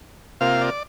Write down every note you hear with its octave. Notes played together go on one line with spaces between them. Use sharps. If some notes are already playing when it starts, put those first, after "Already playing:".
C3 A#3 F4 F5
D5